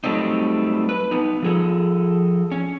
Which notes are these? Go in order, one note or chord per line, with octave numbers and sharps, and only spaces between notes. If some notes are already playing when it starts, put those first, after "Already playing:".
F#3 G3 A3 C4 D#4
B4
B3 D#4
F3 G#4 A4
C#4